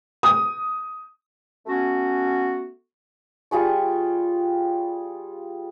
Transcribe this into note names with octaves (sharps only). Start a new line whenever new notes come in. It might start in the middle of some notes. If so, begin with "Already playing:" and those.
D#6
A3 B3 C#4 F#4
G3 F4 G#4 C#6